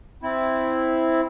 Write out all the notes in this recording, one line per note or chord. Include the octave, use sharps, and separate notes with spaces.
C4 E4